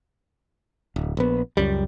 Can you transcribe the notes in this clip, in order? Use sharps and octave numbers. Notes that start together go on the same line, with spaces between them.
D1
A#1 B3
C#2 F#2 G3